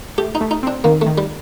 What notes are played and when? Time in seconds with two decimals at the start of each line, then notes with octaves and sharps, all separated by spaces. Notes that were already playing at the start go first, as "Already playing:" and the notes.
0.18 A3 G4
0.35 D#4
0.41 A3
0.51 D#4
0.63 C4 D4
0.84 D#3 A#3
1.01 A3
1.06 D#3
1.18 G3